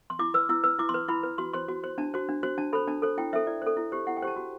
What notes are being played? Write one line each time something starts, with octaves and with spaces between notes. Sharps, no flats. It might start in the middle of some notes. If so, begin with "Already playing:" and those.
C6
E4 D6
B4 E6
E4 E6
B4 E6
E4 D6
C6
B4
E4 B5
B4
F#4 C6
C5 C6
F#4
C5
D4 A5
F#4 C5
D4
F#4 C5
D4 A5
A4 C5 B5
D4 A5
A4 C5
E4 G5
A4 C5 E5
E4 D5
A4 C5
E4
G4 C5
E4 F#5
G5
G4 C5 A5
F#4